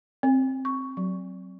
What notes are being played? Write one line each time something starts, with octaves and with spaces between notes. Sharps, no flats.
C4
C#6
F#3